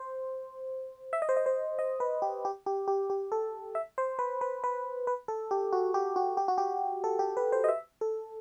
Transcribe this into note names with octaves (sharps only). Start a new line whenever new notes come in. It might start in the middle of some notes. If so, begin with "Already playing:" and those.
Already playing: C5
E5
D#5
C5
D#5
C5
D#5
B4
G4
G4
G4
G4
G4
A4
E5
C5
B4
B4
B4
B4
A4
G4
F#4
G4
F#4
G4
F#4
G4
A4
G4
B4
C5
D#5
E5
A4